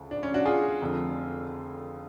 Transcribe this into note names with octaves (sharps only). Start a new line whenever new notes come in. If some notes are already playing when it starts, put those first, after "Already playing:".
Already playing: D2 C#3 F3
D4
C#4
D4 F#4
F4 G#4
F1 F2 D3